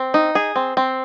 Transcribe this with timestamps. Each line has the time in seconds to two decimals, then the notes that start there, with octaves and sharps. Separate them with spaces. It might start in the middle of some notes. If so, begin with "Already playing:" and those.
Already playing: C4
0.14 D#4
0.35 G#4
0.56 C4
0.77 C4